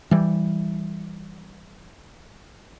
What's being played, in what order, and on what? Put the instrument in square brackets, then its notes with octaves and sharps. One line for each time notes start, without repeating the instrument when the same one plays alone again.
[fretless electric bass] E3 G3